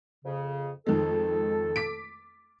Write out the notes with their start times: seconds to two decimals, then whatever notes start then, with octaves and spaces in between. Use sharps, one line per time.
0.25 F2 C#3
0.87 F2 D#3 G#3 A4
1.76 D6 B6 D7